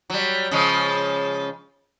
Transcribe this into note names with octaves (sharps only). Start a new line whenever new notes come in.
F#3 G3
C#3 F3 G#3